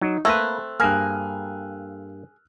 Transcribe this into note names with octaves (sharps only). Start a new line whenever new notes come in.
F#3 D#4
A3 A#3 C4 B4 E6 F#6
G2 A#3 G#4 F6 F#6